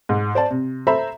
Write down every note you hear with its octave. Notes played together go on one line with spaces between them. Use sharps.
G#2
C5 D5 A5
C3
A4 C5 E5 A#5 B5